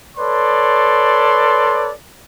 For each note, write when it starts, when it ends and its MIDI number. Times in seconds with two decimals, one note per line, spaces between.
0.17 1.91 69
0.17 1.91 71
0.17 1.91 73
0.17 1.91 74
0.17 1.91 84